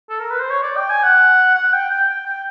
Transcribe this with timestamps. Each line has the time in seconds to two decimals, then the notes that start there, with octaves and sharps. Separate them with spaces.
0.09 A4
0.20 A#4
0.30 B4
0.40 C5
0.50 C#5
0.63 D5
0.77 G5
0.90 G#5
1.03 F#5
1.55 F#5
1.73 G5
1.91 G5
2.08 G5
2.26 G5